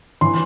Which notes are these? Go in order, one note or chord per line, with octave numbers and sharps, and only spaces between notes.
E3 C6